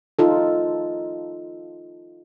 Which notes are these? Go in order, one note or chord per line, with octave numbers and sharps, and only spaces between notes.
D#4 F4 A4